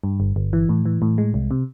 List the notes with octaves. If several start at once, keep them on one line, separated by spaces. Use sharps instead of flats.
G2
G1
G1
E3
A2
E3
A2
G#3
C2
C3